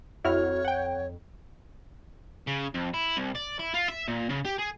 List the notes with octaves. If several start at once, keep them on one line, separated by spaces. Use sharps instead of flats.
F2 E4 F#4 C#5 F6
F#5 G5
C#3
F2
E4
C2
D5
E4
F4
E5
A#2
C#3
G4
G#4